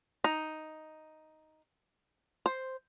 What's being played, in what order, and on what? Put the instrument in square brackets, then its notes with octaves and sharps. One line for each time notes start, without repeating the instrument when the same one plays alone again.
[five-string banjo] D#4
C5